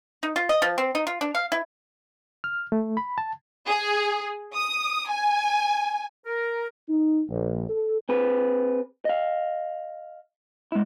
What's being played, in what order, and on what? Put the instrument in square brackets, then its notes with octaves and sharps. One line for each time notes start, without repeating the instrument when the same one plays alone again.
[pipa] D#4
F4
D#5
F3
C4
D#4
F4
D4
F5
E4
[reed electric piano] F6
A3
B5
A5
[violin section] G#4
D#6
G#5
[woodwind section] A#4
[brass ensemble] D#4
A#1
A4
[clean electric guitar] C4 G#4 B4
D#5 F5
G#3 E4